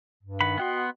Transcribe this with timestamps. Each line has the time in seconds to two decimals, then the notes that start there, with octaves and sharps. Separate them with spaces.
0.24 G2
0.41 D#3 F#5 B5
0.58 B3 F#4 D#5 F#5 G5 C6